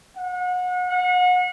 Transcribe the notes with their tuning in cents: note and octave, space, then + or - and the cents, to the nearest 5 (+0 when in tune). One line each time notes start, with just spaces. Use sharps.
F#5 -35
F#5 -35